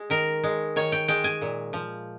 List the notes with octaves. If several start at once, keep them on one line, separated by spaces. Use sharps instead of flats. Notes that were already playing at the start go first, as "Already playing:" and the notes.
Already playing: G#3
D#3 A#4
G#3
D#3 C#5
G5
G#3 G5
G#5
A#2
F3